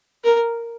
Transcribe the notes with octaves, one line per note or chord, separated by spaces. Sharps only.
A#4